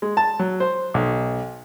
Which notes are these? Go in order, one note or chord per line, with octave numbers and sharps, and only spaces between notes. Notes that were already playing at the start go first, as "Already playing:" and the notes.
G#3
A5
F#3
C5
B1